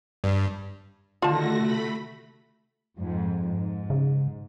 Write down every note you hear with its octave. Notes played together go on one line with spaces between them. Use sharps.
G2
D3 D#3 A3 F4 F#4 A5 A#6
C3 A3 B5
F2 G#2
G#2
C#3